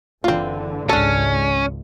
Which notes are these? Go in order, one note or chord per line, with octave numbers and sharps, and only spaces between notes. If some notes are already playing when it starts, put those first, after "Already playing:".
F#1 D3 E3 C4 F4
G#1 C#2 G#2 C#4 D4 A4